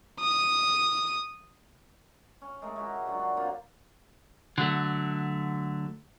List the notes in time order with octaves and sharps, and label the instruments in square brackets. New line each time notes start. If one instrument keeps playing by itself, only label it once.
[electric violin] D#6
[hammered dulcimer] C#4
G#3 A3 A#4
G#3 E4 F#4 G4
D3 F#3 D4 F#5
D4
A#3 C4 F4 G4
[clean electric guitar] D3 F#3 A3